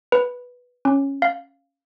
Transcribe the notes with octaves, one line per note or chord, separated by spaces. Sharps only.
B4
C#4
F5